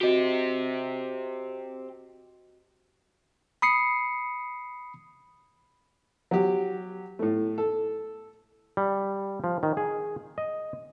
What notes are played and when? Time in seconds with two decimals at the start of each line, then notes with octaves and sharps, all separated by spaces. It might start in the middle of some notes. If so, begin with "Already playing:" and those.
0.01 C4 F#4 G4 D#5
3.62 B5 D#6 C7 C#7
6.31 F#3 G4
7.19 A2 A3
7.58 A4
8.77 G3
9.44 F3
9.63 D#3
9.77 G#4
10.38 D#5